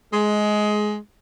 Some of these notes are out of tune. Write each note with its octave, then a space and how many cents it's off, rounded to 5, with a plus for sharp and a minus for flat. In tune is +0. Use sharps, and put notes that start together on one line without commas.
G#3 +15